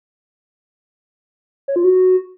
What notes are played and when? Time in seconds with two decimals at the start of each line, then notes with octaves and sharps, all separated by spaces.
1.68 C#5
1.76 F4
1.84 F#4